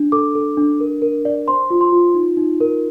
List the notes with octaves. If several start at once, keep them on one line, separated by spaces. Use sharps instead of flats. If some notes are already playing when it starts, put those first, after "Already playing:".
Already playing: D4
A4 D6
A4
D4
A#4
A#4
D5
C5 C6
F4
C6
F4
D#4
D#4
A#4